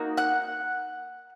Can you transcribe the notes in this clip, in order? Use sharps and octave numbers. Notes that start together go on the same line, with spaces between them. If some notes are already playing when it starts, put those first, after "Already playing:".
Already playing: A#3 D#4 F#4
F#5 F#6